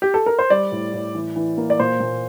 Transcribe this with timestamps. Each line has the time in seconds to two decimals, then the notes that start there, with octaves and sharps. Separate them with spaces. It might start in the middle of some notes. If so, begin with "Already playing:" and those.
0.02 G4
0.14 A4
0.26 A#4
0.39 C5
0.50 G3 D5
0.72 A2
0.94 A2
1.15 E3
1.36 E3
1.58 A#3
1.70 D5
1.79 A#2 C5
2.00 A#2